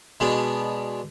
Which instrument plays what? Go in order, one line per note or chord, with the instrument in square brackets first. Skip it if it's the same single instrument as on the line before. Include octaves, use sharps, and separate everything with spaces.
[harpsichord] B2 G#3 B3 D4